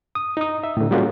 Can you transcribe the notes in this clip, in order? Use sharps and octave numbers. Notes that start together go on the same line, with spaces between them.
D#6
D#4 D#6
E5
A2 D3
G3 G#3 A#3 C#4 F4 F#4